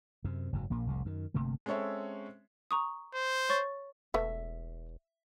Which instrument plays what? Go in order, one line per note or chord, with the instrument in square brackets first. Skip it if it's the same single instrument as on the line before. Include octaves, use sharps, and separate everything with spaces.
[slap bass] F#2 C3
F#1 G#2 F#3
A#1 A#2 A#3
F1 C2 A2
F#2 D#3
G1 C3 A3 A#3
[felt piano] G#3 C4 C#4 A4 C#5 E5
[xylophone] A#5 C#6 D#6
[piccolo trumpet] C5
[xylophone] C#5 C#6 A6
[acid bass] E1 [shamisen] A3 B3 [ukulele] E5